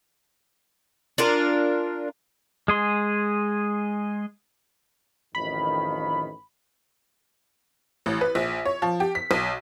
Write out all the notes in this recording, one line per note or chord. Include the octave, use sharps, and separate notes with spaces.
D4 F4 A#4
G#3 G#4 C6
A1 F2 D#3 B5
A1
B4
A#1
C#5
F3
G4
B6
B1